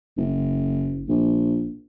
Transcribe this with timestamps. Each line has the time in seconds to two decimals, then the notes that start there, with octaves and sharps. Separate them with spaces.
0.17 F#1
1.08 A#1